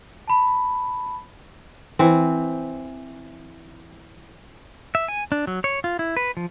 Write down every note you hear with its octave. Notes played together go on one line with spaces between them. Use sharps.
A5 B5
E3 C4
E5
G#5
D4
F#3
C#5
F4
E4
B4
F3